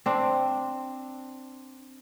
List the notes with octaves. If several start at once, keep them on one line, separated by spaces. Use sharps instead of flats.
C4 D4